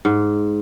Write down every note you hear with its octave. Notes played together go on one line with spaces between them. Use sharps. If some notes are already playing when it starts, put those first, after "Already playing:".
G#2